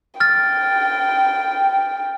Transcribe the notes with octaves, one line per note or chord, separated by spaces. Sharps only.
G5 F6 A6